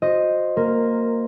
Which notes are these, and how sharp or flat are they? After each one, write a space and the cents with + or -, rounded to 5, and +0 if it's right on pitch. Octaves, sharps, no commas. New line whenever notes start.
F#4 -35 C5 +0 D#5 -5
A#3 -15 A#4 +0 C6 +0